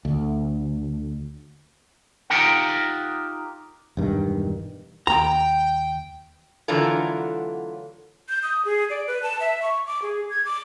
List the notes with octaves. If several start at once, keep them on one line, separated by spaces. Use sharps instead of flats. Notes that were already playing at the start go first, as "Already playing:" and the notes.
D2
D#4 F4 G4 A#4 F#5
E1 G2 D#3
D#2 G5 A#5
D3 E3 F#3 A3 F4 A#4
G6
D#6
G#4
D5
B4
A5
E5
C#6
D6
G#4
G#6
D6